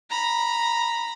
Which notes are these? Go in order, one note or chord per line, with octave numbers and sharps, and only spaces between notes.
A#5 B5